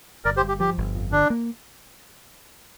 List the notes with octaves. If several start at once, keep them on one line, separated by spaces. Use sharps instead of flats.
G1 A#4 D5
G4 C5
G2
G4
F3 G4
G1
F2
D3 D4
A#3